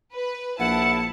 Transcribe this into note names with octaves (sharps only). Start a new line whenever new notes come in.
B4
A#1 E4 F#5 A5